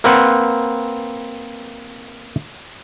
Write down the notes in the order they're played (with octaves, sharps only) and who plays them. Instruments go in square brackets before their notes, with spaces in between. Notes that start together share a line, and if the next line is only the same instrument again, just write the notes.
[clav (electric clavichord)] A#3 C4 B4 F#5